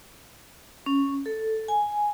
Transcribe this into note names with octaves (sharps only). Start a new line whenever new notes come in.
C#4
A4
G#5